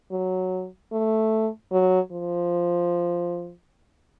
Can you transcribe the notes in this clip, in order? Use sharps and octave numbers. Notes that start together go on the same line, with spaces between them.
F#3
A3
F#3
F3